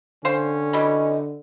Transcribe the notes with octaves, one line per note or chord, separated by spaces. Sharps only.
D3 C#4 C5 F5 G5
E3 F#3 G3 D#5